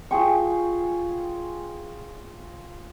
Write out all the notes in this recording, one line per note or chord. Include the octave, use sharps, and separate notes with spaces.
F4 G#4 G5 C#6